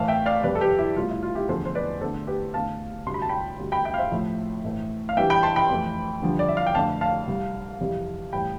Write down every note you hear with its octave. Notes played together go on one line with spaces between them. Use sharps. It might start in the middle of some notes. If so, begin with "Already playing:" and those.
Already playing: A2 E3 A3 F5 A5
E5 G5
D5 F5
F2 C3 G3 B4 D5
A4
G4 B4
E4 G4
C2 B2 A3 F4
E4
F4
E4 G4
E2 D3 F3 A3 A4 C5
C5
B4 D5
E2 D3 A3 A4 C5
G4 B4
E2 D3 A3 F5 A5
D2 C3 G3 C6
B5
A5
G5 B5
D2 D3 G3
G5 B5
E5 G5
F5
C5 E5
A2 F3 A3
A2 E3 A3
F5
G2 E3 G3 E5 G5
G5 B5
A5 C6
G5 B5
F2 E3 A3
G2 D3 F3
D5
E5
F5
G5
F2 D3 A3 F5 A5
F5 A5
C2 C3 G3
F2 C3 E3 G3
A2 E3 G3 G5 B5